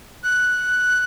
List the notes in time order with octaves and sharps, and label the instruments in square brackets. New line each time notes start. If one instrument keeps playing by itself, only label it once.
[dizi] F#6